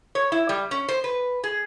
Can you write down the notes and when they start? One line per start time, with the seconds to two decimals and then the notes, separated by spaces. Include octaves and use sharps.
0.15 C#5
0.32 E4
0.49 G3
0.71 C#4
0.88 C5
1.04 B4
1.44 G#4